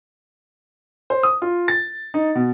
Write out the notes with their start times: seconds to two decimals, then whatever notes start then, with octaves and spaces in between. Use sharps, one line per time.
1.10 C5
1.23 D#6
1.42 F4
1.68 A6
2.14 D#4
2.35 B2